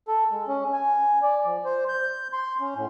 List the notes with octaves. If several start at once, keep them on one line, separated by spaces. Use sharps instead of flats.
A4
G#3
C#4
G#5
D5
F3
C5
G6
C6
C#4
A2